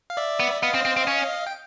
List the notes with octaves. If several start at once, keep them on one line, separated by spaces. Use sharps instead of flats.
F5
D5 E5
B3
B3 D#5 F5
C4
C4
C4
C#4
G5